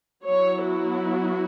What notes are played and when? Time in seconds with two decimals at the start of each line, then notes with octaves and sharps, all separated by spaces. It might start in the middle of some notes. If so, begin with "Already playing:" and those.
0.24 F#3 B3 E4 C#5
0.65 F#4